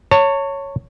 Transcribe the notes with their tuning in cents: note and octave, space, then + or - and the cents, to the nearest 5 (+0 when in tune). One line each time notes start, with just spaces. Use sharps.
C#5 +0 A5 +40